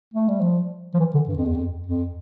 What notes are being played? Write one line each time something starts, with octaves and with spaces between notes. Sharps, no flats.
A3
G3
F3
F3
E3
D3
G2
F2
E2
F2
F2